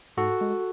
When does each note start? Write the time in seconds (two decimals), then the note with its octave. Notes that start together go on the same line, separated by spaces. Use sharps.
0.17 G#2 F#4 A4
0.41 G#3